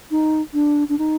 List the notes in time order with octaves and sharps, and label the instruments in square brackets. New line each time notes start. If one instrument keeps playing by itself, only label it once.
[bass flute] D#4
D4
D4
D#4